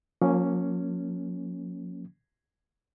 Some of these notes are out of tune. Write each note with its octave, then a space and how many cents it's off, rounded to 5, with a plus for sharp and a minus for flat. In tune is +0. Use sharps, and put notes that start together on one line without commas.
F3 +40 A#3 +0 C#4 +0